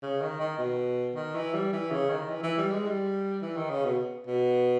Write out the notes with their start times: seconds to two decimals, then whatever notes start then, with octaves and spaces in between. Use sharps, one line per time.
0.02 C#3
0.21 D#3
0.40 D#3
0.59 B2
1.16 D#3
1.35 E3
1.54 G3
1.72 E3
1.91 C#3
2.09 D#3
2.29 E3
2.43 E3
2.58 G3
2.72 G#3
2.86 G3
3.42 E3
3.56 D#3
3.70 C#3
3.85 B2
4.27 B2